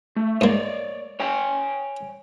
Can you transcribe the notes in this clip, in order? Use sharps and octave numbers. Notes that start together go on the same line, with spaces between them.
A3
G#2 A#3 C#5 D5
C#5 G5 G#5